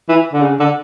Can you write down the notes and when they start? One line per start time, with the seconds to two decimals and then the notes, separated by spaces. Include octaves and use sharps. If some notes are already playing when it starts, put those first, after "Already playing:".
0.09 E3
0.33 D3
0.42 C#3
0.59 D3